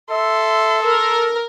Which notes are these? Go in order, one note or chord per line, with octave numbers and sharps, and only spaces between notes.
A4 E5 C6
A#4 E6